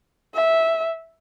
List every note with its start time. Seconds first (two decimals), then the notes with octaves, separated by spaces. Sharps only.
0.34 E5